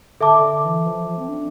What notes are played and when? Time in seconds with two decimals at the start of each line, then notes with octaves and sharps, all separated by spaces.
0.21 D3 A4 E5 A5 D6
0.42 D3
0.64 E3
0.86 F3
1.07 F3
1.19 C4
1.29 D4